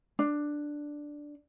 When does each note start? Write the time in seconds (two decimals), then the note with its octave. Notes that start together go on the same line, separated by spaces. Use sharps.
0.19 D4